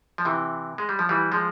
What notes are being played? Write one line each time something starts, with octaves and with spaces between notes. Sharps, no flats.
F3
C3 E3
G#3
G3
F3
E3 G3
F3 G#3